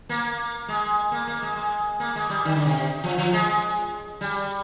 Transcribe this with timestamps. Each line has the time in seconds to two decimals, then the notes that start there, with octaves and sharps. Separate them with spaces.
0.09 A#3
0.68 G#3
1.12 A#3
1.27 A#3
1.42 G#3
1.56 G#3
2.00 A#3
2.16 G#3
2.30 G3
2.45 D#3
2.56 D3
2.66 C3
2.78 C3
3.04 F3
3.18 F3
3.33 G#3
4.21 G3